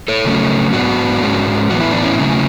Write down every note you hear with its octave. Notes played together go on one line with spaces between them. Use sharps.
A4 C#5
C#3 F#3 A3 C#4
G#2 F#3 B3 D4 F#4
G#2 G#3 C#4
A2 E3 B3 F#4
E4
D4
C#4 E4
C#3 F#3 A3 C#4